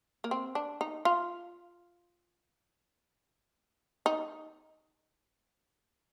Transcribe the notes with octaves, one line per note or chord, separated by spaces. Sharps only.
A#3
C4
D4
D#4
F4
D#4